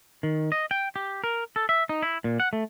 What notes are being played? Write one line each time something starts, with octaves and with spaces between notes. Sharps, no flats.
D#3
D#5
G5
G4
A#4
A4
E5
D#4
E4
A#2
F#5
A3